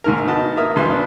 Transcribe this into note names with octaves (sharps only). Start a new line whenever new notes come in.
D#2 G#2 A#4
B3 D#4 F#4 D#5 A5
A#3 E4 A#4 E5 D#6
G#1 D2 G2 E3 B4 C6
B3 D4